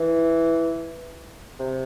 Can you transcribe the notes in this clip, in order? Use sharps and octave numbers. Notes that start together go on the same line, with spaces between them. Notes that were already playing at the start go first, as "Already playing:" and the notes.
Already playing: E3
C3